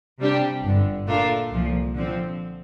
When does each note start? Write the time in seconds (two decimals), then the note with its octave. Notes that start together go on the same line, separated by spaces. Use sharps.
0.19 C3 G3 D4 G4
0.63 G1 G2 D3
1.07 A#2 A3 D4 F4 A#4
1.50 C2 A#2 F3
1.95 D3 F3 C4